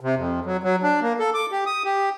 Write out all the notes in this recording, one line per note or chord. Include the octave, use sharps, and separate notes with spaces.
C3
F2
F#3
F#3
D4
A#3
A4
D6
G4
D#6
G4